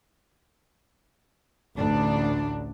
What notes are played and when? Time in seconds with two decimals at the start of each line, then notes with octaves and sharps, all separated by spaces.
1.75 A1 D2 D4